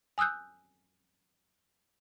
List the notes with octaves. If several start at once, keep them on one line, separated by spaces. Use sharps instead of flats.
G#5 D#6 E6 F#6 G6